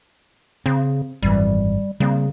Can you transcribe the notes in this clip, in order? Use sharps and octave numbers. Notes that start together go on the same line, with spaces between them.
C#3 C4
G#1 F#2 E3 G3
C#3 G3 A#3 C4